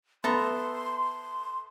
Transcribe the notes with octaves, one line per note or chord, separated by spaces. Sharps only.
B3 A4 E5 A#5 C6